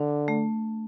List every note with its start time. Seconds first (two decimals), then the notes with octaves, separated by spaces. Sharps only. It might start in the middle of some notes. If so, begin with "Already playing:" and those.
Already playing: D3 D4
0.28 A3